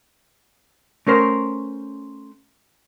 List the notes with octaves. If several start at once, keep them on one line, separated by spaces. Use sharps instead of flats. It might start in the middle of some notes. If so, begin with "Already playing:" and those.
A3 C#4 A#4 C5